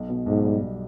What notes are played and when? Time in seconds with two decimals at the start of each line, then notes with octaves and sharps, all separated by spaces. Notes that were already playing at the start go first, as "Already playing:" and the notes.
Already playing: B1
0.09 B2
0.26 B1 G#2
0.45 G3
0.62 B1